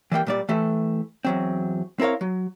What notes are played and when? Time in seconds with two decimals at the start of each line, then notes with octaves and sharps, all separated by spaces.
0.12 E3 G3 A#3 G5
0.26 A#2 G3 D5
0.49 E3 A3 G4 A4
1.25 E2 F#3 C4
2.00 C4 E4 A#4 C#5 F5
2.21 F#3